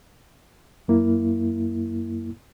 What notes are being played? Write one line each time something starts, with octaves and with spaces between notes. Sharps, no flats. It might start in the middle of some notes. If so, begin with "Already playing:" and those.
F#2 A#3 E4